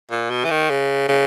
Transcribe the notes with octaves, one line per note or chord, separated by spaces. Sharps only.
A#2
B2
E3
D#3
C#3
C#3